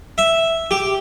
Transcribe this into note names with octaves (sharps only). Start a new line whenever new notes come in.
E5
G4